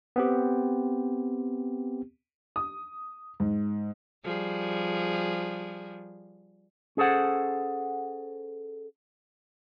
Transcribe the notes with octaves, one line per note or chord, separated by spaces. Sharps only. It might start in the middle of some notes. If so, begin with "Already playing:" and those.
B3 C4 G4
D#6
G#2
F3 G3 G#4
C#4 G#4 A4 C5 F#5